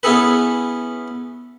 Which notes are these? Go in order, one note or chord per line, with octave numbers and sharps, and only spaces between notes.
B3 C#4 E4 G#4 A4 B4